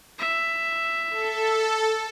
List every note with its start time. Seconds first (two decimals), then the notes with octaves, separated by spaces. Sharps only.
0.19 E5
1.10 A4